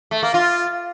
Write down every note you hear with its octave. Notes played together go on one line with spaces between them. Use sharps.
A3
A#3
F4